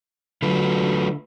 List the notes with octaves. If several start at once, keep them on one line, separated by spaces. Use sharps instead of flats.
D3 F#3 A3 F4 B4